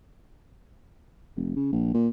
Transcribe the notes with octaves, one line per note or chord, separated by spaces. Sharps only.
F1
C#3
A#1
A#2